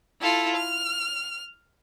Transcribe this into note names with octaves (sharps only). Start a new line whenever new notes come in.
E4 F4 A4
F6